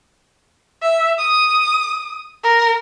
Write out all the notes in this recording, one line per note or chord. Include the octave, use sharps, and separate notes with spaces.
E5
D#6
A#4